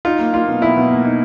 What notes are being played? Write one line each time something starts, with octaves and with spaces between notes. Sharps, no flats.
D#4 F4
A#3
A#3 F4
B2
B2 E4
B2
A#3
D#4